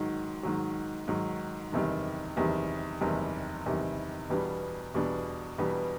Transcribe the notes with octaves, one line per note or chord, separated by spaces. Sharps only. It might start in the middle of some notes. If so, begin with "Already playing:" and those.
Already playing: G#2 D#3 F#3
G#2 D#3 F#3
G#2 D#3 F#3
F#1 E2 C3 D#3 G3
F#1 E2 C3 D#3 G3
F#1 E2 C3 D#3 G3
F#1 E2 C3 D#3 G3
E2 B2 G3 B3 D4
E2 B2 G3 B3 D4
E2 B2 G3 B3 D4